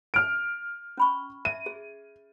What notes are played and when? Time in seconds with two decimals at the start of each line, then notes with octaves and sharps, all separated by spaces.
0.14 F6 D7
0.97 C#4 B5 C#6
1.45 E5 D#7
1.66 G#4